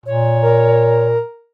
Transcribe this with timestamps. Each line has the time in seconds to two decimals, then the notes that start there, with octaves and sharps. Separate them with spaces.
0.06 A#2 C#5
0.42 A#4